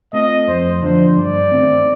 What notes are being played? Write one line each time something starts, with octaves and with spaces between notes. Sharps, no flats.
A3 C4 F4 D#5
F2 C5
D3 F3 A#3 D4 C5
G2 D5
D#3 A3 C4